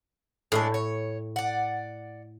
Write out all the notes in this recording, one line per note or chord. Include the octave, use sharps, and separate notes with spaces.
A2 G#3 D4 A4
C#5
D5 F#5